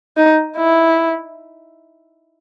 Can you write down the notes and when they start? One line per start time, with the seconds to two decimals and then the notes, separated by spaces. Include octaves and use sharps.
0.17 D#4
0.58 E4